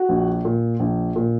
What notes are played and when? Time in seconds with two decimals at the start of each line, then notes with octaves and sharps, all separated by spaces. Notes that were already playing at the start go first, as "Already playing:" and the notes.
Already playing: F#4
0.09 A#1
0.45 A#2
0.80 A#1
1.16 A#2